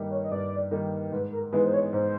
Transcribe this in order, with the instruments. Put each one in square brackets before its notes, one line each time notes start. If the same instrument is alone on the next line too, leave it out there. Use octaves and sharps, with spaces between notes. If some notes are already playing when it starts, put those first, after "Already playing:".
Already playing: [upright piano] G2 D#3 G3 A#3 D#4
[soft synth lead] C#5
D#5
[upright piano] G2 [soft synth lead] D5
[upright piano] D#3 G3 A#3 D#4
[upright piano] G#2 [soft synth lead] B4
[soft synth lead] A#4
[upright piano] E3 G#3 B3 D#4 [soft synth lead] B4
[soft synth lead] C5
C#5
[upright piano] G#2 [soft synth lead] C5